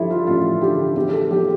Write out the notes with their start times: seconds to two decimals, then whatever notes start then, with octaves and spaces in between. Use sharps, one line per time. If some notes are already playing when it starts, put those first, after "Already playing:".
Already playing: G2 F3 E4 G4 A4
0.10 F4
0.27 A1 F4
0.61 D3 G4
0.96 E2 G4
1.13 A4
1.30 F3 G4